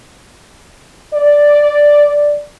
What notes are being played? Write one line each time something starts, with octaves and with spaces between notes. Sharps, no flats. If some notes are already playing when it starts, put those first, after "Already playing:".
D5